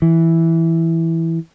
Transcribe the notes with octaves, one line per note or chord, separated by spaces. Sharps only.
E3